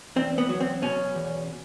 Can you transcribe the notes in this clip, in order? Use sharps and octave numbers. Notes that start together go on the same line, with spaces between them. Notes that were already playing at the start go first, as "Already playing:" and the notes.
E2 C4
B3
F#3
C4
B2 C#4
E2